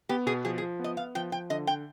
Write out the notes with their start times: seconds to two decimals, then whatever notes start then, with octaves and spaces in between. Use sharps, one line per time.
0.09 B3 G4
0.26 B2 G#4
0.45 F3 G#4
0.58 G#4
0.62 F3
0.80 B3 D#5
0.97 B3 F5
1.15 F3 G5
1.32 F3 G5
1.50 D3 D#5
1.67 G5